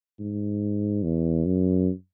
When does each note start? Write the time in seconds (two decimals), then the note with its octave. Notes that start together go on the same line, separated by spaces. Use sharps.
0.20 G#2
1.03 E2
1.46 F#2